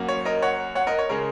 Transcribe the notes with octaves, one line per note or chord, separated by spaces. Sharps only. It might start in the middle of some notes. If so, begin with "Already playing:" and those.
Already playing: F#2 F#3 A#3
C#5
A#4 D#5
C#5 F#5
C#5 F#5
A#4 D#5
C#5
C#3 G#3 C#4 A#4